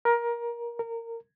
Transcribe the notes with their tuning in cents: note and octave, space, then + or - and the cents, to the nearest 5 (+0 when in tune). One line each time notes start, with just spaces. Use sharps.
A#4 +20
A#4 -20